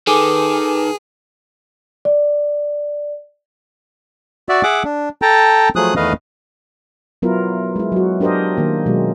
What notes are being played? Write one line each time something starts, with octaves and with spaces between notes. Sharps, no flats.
D#3 G#4 A4 B4 G#5 A5 D6
D5
F#4 D5 E5
G#4 E5 F#5 D6
D4
A4 G5 A5 A#5
F3 F#3 A3 G#4 D#6 F#6
E2 D#3 A3 B4 D#5 F5
F#3 B3 E4 F4 A#4
G#3 E4
F#3 F#4
D4 G4 A#4 C5 D#5
D#3 A#3
B2 F#3 G#3